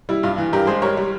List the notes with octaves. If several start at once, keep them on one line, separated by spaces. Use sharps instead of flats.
G3 E4
G2 F4
E3
G2 G4 A#4
G#3 G#4 C5
G3 A#4 C#5
G3